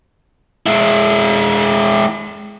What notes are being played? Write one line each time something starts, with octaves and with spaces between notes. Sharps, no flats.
G#3 E4